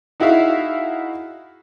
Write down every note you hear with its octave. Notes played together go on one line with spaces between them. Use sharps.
D#4 E4 F#4 G#4 E5 F5